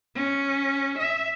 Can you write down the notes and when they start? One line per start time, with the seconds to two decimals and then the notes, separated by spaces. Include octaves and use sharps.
0.15 C#4
0.98 E5